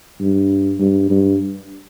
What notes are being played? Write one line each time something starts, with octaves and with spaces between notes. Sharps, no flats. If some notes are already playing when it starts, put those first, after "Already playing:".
G2
G2
G2